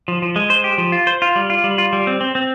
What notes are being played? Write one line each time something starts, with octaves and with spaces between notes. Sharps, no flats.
F3
F3
G#3
C5
G4
F3
F4
C5
F4
G3
F4
G3
F4
G3
C4
C4
C4